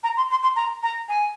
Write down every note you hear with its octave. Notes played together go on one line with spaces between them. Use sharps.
A#5
C6
C6
C6
A#5
A#5
G#5